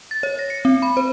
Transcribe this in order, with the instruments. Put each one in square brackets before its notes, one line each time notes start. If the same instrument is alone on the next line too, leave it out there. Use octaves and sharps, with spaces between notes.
[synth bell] A6
C#5
A#6
C#7
C4
B5
C5